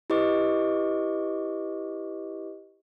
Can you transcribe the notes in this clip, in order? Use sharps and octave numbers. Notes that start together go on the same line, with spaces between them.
E4 G4 B4 D#5 C#6 D6